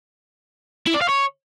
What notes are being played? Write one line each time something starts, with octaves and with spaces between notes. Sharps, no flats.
E4
D5
F5
C#5